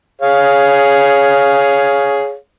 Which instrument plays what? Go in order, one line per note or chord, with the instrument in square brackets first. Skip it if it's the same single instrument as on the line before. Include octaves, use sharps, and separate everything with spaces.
[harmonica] G#4 C#5 F5